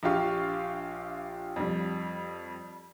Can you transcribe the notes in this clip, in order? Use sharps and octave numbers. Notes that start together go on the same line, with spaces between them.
A#1 D4 F4 G4 F5 C#6
F2 G3